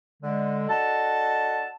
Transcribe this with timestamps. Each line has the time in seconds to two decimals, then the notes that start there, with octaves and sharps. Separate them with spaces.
0.22 D3 G#3
0.69 D4 F#4 A4 D#5 A5